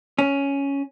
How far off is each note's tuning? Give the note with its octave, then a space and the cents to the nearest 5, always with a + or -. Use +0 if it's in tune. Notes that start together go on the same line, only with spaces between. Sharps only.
C#4 +5